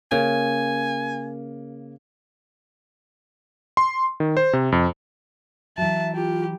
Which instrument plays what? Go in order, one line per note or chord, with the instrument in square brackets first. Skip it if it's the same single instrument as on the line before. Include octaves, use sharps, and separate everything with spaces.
[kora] C#3 [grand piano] A#3 [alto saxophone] G#5
[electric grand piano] C6
D#3
C5
C3
F2
[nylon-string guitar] E3 F#3 [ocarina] E5 [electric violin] A5
[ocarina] F4 [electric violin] G4